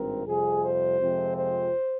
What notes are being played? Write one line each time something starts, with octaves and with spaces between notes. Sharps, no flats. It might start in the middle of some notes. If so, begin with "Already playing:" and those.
Already playing: G#1 G2 C4 A#4
F2 C3 G3 G#4
C5
F2 C3 F3 G#3 C4
C5